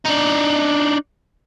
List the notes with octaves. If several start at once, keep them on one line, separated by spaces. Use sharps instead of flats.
D4 D#4